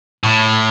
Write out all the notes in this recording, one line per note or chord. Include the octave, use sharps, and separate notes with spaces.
A2